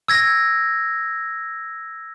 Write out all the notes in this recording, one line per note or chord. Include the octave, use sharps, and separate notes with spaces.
E6 G#6 A#6